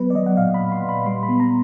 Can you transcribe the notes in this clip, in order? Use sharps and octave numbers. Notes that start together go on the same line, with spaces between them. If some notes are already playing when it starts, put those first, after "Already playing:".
Already playing: F#3 B3 B4
D5
F#3 D#5
F#5
A#2 F5
B5
A#2
C6
A#2 B5
G3 C6
B5
B3
A#5